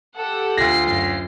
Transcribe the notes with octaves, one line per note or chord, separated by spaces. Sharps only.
G4 A4 F#5
D2 F4 A#6 C7
F#2